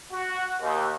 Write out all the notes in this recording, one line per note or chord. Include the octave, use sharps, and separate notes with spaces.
F#4
D#2